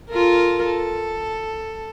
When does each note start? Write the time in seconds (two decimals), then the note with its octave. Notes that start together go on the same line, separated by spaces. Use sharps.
0.10 F4 A4 A#4
0.65 A4